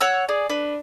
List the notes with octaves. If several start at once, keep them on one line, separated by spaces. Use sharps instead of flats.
C#5 F#5 E6
G#4 D5
D4 B4